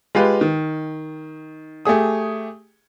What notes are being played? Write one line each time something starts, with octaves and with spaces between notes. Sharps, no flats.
G#3 F4 G4 B4
D#3
A3 G4 G#4 D#6